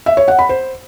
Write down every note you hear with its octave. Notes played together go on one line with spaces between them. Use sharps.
E5
C#5
F#5
B5
C5